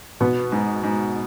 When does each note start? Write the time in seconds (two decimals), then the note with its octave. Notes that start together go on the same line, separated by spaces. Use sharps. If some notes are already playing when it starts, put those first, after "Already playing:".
0.20 B2 B3
0.52 G#2
0.83 G#2